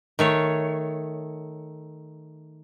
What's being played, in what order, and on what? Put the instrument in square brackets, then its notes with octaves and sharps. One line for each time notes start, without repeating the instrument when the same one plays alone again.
[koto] D#3 A3 C#5